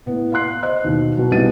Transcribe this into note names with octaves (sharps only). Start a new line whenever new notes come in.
A2 B3
F5 F#5 C6 F#6 C7
C5 D#5 F#6
D#2 B2 D#3
B2 F#3
B1 C3 G3 B3 A6 D#7